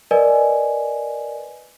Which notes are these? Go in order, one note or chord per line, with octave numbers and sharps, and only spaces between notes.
A#4 B4 D5 D#5 G#5